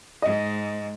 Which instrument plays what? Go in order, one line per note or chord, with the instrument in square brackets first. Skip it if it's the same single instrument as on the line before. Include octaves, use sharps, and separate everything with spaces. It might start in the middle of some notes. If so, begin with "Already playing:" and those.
[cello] G#2 [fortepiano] D#5